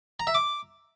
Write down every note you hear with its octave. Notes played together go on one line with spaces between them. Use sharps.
A#5
E5
D6